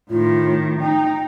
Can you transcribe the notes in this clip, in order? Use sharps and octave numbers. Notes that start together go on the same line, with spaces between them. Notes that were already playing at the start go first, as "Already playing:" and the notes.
A2 D#3 F4
D#4 G5